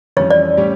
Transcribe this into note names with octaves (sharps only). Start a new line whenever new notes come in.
F2 E3 G3 C#4 C#5
D5
A2 G3 C#4 G4